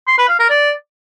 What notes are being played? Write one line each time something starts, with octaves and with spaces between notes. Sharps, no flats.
C6
B4
F5
A#4
D5